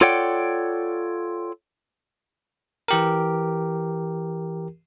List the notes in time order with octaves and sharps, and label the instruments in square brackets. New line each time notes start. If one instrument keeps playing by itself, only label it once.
[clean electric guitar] F4 A4 C#5 D5 F#5 G5
[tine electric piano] E3 G4 A#4